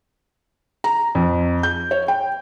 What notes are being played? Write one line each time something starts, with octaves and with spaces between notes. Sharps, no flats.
A#5
F2
G6
C#5
G5